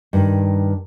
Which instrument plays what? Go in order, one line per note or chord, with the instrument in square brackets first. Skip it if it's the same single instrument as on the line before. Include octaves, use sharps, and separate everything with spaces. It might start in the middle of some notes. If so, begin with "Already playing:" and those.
[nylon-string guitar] G2 D#3